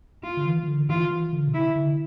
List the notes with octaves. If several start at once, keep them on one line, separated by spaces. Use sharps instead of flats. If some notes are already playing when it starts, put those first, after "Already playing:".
F4
D3
E3
E3
D3
E3 F4
E3
D3
B2
C3 E4
D3